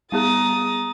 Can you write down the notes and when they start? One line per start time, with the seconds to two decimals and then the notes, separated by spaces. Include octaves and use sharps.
0.12 G3 B3 G#4 A#5 D#6 A6